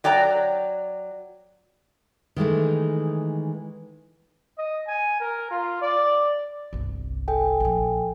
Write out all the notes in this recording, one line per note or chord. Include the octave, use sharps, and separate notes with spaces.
F#3 D5 G5 A#5
D#3 E3 G#3 A3
D#5
G#5
A#4
F4
D5
G1 C2
A4 G5 G#5
A#1 F3